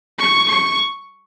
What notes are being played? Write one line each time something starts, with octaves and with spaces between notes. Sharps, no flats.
C#6
C#6